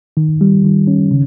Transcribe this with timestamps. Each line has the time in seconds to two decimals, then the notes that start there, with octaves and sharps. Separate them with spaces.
0.17 D#3
0.41 G3
0.64 D#3
0.87 C#4
1.11 C#3